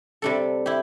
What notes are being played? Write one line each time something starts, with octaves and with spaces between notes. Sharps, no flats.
C3 G3 D4 A4
E4 G4